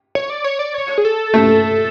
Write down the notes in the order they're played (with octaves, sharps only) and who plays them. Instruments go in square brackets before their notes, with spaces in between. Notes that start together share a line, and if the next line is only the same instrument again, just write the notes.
[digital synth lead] C#5
D5
C#5
D5
C#5
G#4
A4
[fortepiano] A3